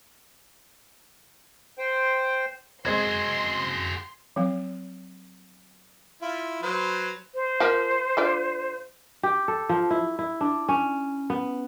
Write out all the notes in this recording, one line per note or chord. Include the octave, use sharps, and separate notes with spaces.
C5 G5
G#3 C4 F#4 G#4 C6 G#6
F3 F#3 C4 F5
E4 F4
F#3 B4 C5
C5
F3 A#4 F#5
D3 F4 D5
G4
A4
F3
E4
E4
D4
C#4
B3